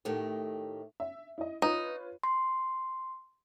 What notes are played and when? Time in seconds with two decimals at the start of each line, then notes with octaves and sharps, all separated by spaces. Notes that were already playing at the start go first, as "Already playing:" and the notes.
0.05 A2 D#3 A3 G4
1.00 E5
1.38 E4 D#5
1.62 D#4 F4 B4 C#5
2.24 C6